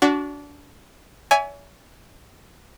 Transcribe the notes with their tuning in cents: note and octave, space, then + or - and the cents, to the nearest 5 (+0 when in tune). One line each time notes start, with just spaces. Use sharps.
D4 -25 F#4 +0
C#5 +40 E5 +0 G#5 +0